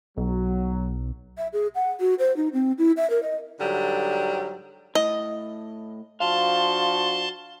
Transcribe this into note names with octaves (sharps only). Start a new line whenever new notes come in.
B1 F#3
E5
G#4
F#5
F#4
C5
D#4
C4
E4
E5
A#4
D#5
G#2 D3 F#3 G3
A2 D#5
F3 D4 F#4 F5 A5 C6